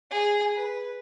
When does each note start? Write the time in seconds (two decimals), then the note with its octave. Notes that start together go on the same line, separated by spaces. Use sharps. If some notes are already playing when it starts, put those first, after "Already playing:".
0.11 G#4
0.55 B4